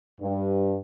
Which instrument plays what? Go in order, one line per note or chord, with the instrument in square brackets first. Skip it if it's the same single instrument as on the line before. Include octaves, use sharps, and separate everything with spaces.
[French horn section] G2